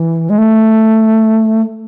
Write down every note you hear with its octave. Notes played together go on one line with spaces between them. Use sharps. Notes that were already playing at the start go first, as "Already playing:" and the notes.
Already playing: E3
G#3
A3